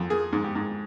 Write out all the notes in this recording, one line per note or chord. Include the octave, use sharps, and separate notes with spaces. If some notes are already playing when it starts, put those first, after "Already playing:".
Already playing: F2
A#3 G#4
G#2
G4
G#2